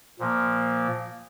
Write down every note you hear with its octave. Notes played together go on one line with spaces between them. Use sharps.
A#2 F3 A#3